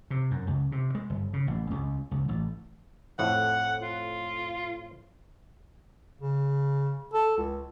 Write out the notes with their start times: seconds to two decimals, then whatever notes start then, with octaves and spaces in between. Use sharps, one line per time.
0.10 C3
0.31 F#2
0.47 C#2
0.72 C3
0.95 G#3
1.10 G1
1.33 C#3
1.47 A1
1.71 C#2
2.11 C#2
2.28 A1
3.19 F2 A2 F#5
3.81 F4
6.21 C#3
7.13 A4
7.37 C#2